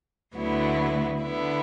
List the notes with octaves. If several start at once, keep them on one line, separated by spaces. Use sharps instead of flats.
D2 D3 F#3 B3 E4
D3 B3 E4